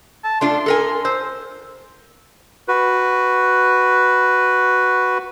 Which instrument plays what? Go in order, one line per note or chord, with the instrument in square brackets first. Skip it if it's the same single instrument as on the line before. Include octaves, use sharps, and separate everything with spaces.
[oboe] A5
[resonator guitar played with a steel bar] A3 D4 F4 [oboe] C6
[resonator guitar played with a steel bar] A4 A#4 G#5
[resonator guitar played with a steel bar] C5 [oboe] E6
[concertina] F#4 B4